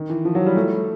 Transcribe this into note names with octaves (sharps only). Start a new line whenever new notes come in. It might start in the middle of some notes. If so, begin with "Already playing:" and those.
Already playing: D#3
E3
F3
F#3
G3
A3